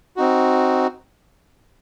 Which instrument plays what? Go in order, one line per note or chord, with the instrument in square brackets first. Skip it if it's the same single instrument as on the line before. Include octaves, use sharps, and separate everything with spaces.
[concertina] C4 D#4 F#4